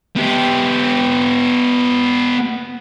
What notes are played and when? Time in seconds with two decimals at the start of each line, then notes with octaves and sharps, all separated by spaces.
0.16 B3 G4